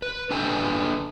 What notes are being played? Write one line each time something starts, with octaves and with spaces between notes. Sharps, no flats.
B4
D4 A4 B4 G5 G#5